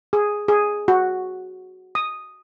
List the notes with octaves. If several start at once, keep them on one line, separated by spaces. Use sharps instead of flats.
G#4
G#4
F#4
D#6